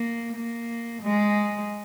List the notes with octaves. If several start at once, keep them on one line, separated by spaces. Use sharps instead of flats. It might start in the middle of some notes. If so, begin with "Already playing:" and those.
Already playing: A#3
A#3
G#3